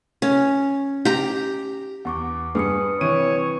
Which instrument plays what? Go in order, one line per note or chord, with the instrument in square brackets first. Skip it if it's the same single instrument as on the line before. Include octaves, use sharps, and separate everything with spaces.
[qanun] C#4
G4 A#5
[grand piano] E2 [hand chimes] F#5 C#6 D6
[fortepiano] G2 [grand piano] G#4 [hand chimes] B4 D#6 C#7
[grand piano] C3 E3 D#7 [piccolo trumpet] C#5